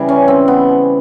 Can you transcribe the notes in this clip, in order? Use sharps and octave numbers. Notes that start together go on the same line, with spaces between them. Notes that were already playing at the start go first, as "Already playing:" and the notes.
Already playing: C#3 E3 G3
C#4
C4
B3